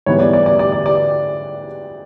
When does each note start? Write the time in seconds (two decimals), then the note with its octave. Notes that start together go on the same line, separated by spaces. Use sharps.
0.06 G#2 E3 G3 B3 C#5
0.20 D5
0.33 D5
0.46 D5
0.59 D5
0.72 D5
0.86 D5